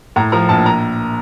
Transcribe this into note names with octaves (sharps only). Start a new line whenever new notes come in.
A2 A#5
F3 A#5
A#1 A5
A#5